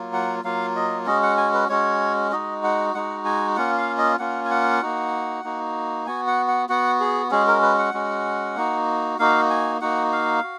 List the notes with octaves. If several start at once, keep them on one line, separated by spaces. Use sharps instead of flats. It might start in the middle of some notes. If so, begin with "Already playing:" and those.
Already playing: F#3 A#3 F4
F#5
F#3 A#3 F4 F5
D#5
G#3 C#4 F#4 D#5
F#5
G#5
B4
G#3 C#4 F#4 C#5
G#3 D#4 F#4 D#5
F#5
G#3 D#4 F#4 F#5
G#5
A#3 C#4 F4 F#5
F5
D#5
A#3 C#4 F4 F#5
G#5
F#5
A#3 D#4 F#4
A#3 D#4 F#4
B3 F#4 G#5
F#5
F#5
B3 F#4 F#5
G#4
G#3 C#4 F#4 G#4
A#4
B4
F#5
G#3 C#4 F#4
A#3 D#4 F#4
A#3 D#4 F#4 F5
G#5
A#3 D#4 F#4 F#5
F5
F#4